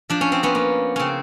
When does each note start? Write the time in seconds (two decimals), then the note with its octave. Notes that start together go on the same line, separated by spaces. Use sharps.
0.10 F3 D4
0.21 C#4
0.32 C4
0.43 B3 C#4
0.55 A#3
0.96 C#3 C4 C#4